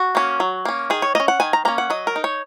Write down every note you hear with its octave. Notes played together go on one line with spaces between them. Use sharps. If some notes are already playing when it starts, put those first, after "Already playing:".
Already playing: F#4
A#3 C#4
F#3
A#3 C#4
D#3 G#4
C#5
A#3 C#4 D#5
F#5
D#3 G#5
A#5
A#3 C#4 A#5
F#5
F#3 D#5
A#4
D#4
C#5